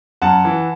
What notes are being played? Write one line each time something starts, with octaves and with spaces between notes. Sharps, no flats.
F#2 F#5 A5
E3